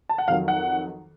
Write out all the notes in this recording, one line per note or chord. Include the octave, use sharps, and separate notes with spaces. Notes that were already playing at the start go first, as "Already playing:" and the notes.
A5
F#5
F2 D#3 F#3 F5
F#5